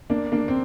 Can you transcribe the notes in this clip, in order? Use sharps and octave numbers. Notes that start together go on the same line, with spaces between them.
A#3 D4
A#3 D4
C4